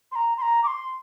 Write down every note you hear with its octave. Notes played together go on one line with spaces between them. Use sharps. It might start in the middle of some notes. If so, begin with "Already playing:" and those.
C6
A#5
C6
A#5
D6
C6